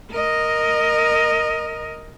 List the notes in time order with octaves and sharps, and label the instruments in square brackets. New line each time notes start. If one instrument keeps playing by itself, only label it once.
[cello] A#4 D#5